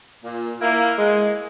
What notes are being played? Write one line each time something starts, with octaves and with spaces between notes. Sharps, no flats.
A#2
A#3 E4
G#3